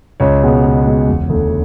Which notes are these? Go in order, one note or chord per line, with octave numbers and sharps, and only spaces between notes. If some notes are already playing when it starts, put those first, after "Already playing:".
C#2 C#5
B2 G#3 B3
C#2
B2 G#3 B3
E1
D2 D3